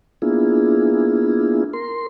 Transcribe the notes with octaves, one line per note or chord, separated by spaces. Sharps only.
A#3 B3 D4 E4 F4 G#4
A#4 C6